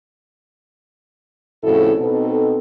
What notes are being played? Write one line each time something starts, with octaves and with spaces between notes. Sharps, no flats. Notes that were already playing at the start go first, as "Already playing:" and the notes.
F2 A2 C#3 E4 F#4 A4
B2 B3 C4 D#4 A4